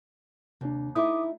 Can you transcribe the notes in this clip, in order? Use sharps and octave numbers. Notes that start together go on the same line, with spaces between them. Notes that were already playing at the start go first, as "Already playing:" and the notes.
D#2 C3 D4
A3 D#4 E4 D6 D#6